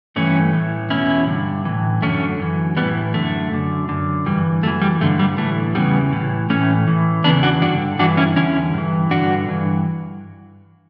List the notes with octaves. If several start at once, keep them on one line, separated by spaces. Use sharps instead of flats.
G2 E3 A3 C#4
A2 E3
E2 B2 C#4 E4
G2 D3
A2 E3
F#2 D3 A3 C#4
F#2 E3
A2 E3 G3 B3
F#2 D3 A3
F#2 D3
F#2 D3
G2 E3 G3
F#2 E3 A3
G3
G2 D3 A3
G3
A2 E3 A3
E2 C#3 E3 G3 B3
A2 E3
A2 E3 A3 C#4
A2 E3
E2 C#3 E3 B3 D4
D4 F#4
G2 D3 D4 F#4
G2 E3 D4 F#4
C#4 E4
E2 D3 C#4 E4
G2 E3
G2 D3 D4 F#4
G2 E3